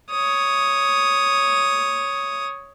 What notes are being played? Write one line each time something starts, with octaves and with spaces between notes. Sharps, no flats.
C#5 D#6